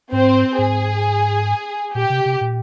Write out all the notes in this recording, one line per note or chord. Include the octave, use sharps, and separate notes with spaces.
G#2 C4 C5
G#2 G#4
A#2 G4
C3
C3
A#2